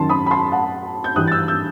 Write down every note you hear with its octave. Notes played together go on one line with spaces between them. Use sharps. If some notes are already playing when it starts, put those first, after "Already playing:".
Already playing: F#2 D#3 F#3 A5 C6
B5 D#6
B5
A5 C6
F#5 A5
G6
G2 E3 G3 D#6 F#6
A6
E6 G6
E6 G6